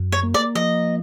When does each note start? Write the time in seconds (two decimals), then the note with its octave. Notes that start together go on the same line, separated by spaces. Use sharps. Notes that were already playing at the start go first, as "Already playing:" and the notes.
Already playing: F#2
0.12 C#5
0.23 A#3
0.34 D5
0.55 F3 D#5